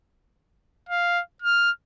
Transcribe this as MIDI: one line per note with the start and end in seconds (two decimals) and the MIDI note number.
0.89 1.21 77
1.42 1.71 89